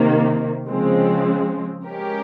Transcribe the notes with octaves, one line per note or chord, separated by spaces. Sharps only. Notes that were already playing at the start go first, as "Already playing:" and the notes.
Already playing: C3 D#3 A#3
C#3 F3 G#3 C4
G#3 C#4 G4 A#4